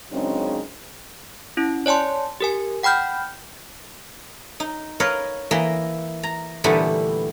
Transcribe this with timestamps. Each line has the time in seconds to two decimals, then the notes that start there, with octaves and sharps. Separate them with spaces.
0.12 F#2 C#3 G#3 C4 D4 D#4
1.57 C#4 E4
1.86 C#5 D5 G#5 A5 C6
2.40 G4 A#4 G#5
2.83 F#5 G5 B5 F6 G6
4.60 D#4
5.00 A#4 B4 C#5 D#5 F5
5.51 E3 A#3 D#5
6.23 A#5
6.64 A#2 D3 E3 G3 A3 B3